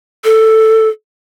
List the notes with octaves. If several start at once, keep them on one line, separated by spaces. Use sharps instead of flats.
A4